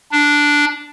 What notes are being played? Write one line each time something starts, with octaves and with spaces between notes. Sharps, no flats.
D4